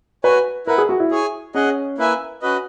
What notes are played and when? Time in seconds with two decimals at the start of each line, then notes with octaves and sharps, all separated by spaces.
0.24 F#4 B4 C#5 G#5
0.67 E4 A#4 B4 F#5
0.78 G#4
0.89 F#4
1.00 E4
1.11 G#4 C#5 G#5
1.54 C#4 G#4 D#5 F#5
1.98 A#3 E4 B4 E5 G#5
2.42 C#4 F#4 B4 D#5